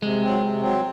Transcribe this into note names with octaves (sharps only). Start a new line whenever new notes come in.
C3 G#3
F#3 C4
C3
F#3 C4